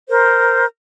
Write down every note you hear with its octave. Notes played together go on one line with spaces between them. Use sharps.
A#4 C5